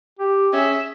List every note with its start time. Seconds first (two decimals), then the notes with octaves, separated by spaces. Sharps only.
0.19 G4
0.53 C#4 G#4 E5